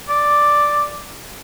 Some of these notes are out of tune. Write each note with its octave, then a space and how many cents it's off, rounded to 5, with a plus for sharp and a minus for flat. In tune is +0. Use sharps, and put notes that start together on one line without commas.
D5 +0